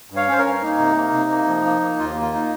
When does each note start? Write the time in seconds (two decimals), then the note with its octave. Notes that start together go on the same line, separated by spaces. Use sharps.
0.10 G2
0.16 C#5 F5
0.28 C#4 C5
0.38 A#4 C#5
0.45 G2
0.61 A#3 D#4
0.79 C3
0.96 A#3
1.13 C3
1.30 A#3
1.47 F3
1.64 A#3
1.81 A#3
1.98 D#2 F4
2.15 A#3
2.21 F4
2.33 D#4